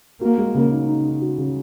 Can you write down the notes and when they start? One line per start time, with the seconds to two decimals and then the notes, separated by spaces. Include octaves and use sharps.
0.21 A#3 F#4
0.38 G#3
0.54 C#3
0.71 D#4
0.88 D#4
1.05 D#4
1.22 F#4
1.38 C#3